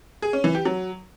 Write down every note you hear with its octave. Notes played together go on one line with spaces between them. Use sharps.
G#4
C#4
E3
G4
F#3